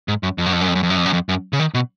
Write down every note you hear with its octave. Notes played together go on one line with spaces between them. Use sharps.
G#2
F#2
F2
F#2
F2
F#2
F2
F#2
F2
F#2
F2
F#2
F2
F#2
C#3
D#3
B2